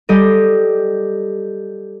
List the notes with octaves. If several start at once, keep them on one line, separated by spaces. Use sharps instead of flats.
G3 G4 A4 D#5